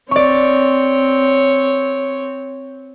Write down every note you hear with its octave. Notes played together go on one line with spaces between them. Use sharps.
C4 C#5 D5 C#6